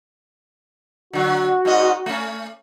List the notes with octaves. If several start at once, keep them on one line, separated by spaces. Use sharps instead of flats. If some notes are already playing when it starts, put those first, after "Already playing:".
D3 F#3 F#4
G#2 C#4 D#5
A3 C#4